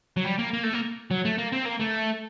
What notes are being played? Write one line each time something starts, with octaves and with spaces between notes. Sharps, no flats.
F#3
G3
A#3
A#3
A3
A#3
F#3
A3
A#3
C4
A#3
A3